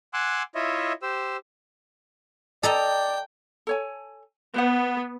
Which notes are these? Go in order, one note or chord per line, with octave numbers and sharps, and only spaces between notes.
F#5 G#5 C6 D6 E6 F#6
E4 F4 C#5 D#5 E5
G4 C5 E6
A4 D5 D#5 G5 A#5
A4 C#5 G#5
B3 B4 C5 F#5